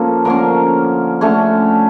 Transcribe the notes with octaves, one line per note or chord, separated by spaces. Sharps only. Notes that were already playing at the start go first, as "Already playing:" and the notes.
Already playing: F3 A#3 C#4 A4
D3 F3 A#3 C#4 A#4
D3 A3 C#4 C#5